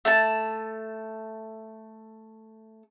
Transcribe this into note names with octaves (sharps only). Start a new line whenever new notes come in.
A3 A5